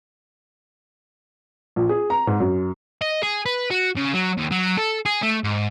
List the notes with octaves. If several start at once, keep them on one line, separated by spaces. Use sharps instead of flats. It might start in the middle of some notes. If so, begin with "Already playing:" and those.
A#1
G#4
A#5
G#2
F#2
D#5
G#4
B4
F#4
C#3
F#3
D#2
F#3
A4
G#4
A3
G#2